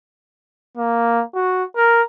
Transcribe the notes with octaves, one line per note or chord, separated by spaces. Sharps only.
A#3
F#4
A#4